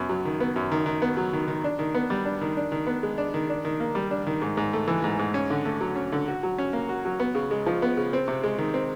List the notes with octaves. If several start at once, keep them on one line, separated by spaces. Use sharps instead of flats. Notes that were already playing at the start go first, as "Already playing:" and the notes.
Already playing: F#2 B3
F#3
D#3
B3
F#2
D#3
D#3
B3
F#3
D#3
D#3
D4
D#3
B3
G3
D4
D#3
D4
D#3
B3
G#3
D4
D#3
D4
D#3
A#3
G3
D4
D#3
G#2
G#2
A3
E3
G#2
G#2
C#4
D3
A3
F#3
C#4
D3
F#4
F#3
C#4
A#3
F#4
F#3
B3
C#3
G#3
F3
B3
C#3
C4
C3
G#3
D#3
C4